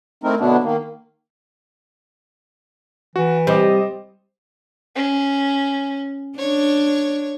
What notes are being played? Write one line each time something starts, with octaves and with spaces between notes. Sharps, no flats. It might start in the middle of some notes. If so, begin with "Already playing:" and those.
A3 C4 D#4 E4 A#4
B2 D3 F#3 B3 D4 E4
D#3 A#3
E3 F#4
C2 G3 G4 C5 D#5
C#4
D4 C#5